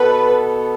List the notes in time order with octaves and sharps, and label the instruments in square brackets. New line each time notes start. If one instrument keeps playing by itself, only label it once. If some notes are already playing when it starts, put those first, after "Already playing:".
Already playing: [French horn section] B2 B3 A4 [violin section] B4